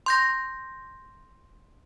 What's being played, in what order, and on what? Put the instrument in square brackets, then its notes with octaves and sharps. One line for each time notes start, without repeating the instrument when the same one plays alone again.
[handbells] C6 G6 A#6